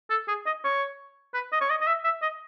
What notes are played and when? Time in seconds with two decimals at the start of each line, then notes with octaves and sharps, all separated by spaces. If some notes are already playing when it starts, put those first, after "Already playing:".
0.10 A4
0.28 G#4
0.46 D#5
0.64 C#5
1.34 B4
1.52 D#5
1.61 C#5
1.70 D#5
1.81 D#5
1.87 E5
2.04 E5
2.22 D#5